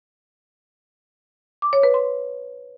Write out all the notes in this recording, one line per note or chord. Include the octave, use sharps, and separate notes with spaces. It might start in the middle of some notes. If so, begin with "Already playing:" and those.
D6
C#5
B4
C6